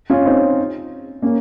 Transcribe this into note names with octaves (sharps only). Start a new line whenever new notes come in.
C#4 F4
C4 D#4
A#3 C#4